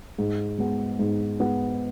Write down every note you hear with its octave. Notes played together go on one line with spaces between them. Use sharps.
G#2
G#3 B3
G#2
G#3 B3